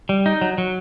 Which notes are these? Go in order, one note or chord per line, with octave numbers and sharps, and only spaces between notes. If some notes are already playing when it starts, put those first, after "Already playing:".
G3
D#4
F#3
F#3